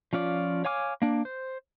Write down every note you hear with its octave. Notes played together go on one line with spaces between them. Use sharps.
F3 C#4 F4 D5
C#5 F5 G#5 D6 F6
A#3 D4
C5